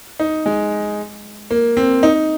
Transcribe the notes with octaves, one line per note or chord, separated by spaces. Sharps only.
D#4
G#3
A#3
C4
D#4